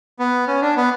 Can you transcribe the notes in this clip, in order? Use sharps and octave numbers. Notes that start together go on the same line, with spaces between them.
B3
C#4
D4
B3